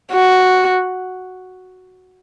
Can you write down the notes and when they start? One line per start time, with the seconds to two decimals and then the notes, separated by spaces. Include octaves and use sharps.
0.13 F#4